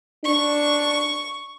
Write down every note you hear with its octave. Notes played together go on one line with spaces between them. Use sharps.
D4 C#6